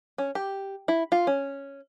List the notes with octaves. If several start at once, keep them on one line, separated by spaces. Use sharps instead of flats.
C#4
G4
E4
F4
C#4